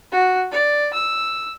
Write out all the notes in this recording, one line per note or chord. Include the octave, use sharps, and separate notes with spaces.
F#4
D5
E6